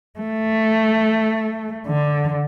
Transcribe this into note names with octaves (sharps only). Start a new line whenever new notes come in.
A3
D3